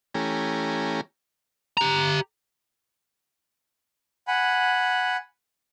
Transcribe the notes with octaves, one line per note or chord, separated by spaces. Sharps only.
E3 A3 C#4 G4 G#5 A#5
G4 A#5
F#5 G#5 B5